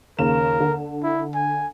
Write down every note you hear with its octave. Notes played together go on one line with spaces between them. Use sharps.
D#2 C#3 A#4 E7
D3
E4
G#5